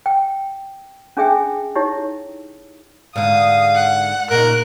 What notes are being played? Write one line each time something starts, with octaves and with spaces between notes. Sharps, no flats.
G5
C#4 D4 G#4 E5 G5
D#4 E4 G4 C#5
G#2 D3 F5 D#6
F#5
A#2 C#3 D#4 A#4 F#6